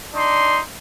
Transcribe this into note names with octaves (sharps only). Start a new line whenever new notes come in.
D4 D#4 C6